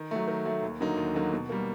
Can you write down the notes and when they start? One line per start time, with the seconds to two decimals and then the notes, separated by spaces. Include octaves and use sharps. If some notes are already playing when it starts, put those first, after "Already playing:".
Already playing: D#3
0.11 F#3 A3
0.27 D#3
0.45 F#3 A3
0.62 D#2
0.80 D3 F#3 A#3 D#4
0.97 D#2
1.15 D3 F#3 A#3 D#4
1.33 B2
1.49 G3 A#3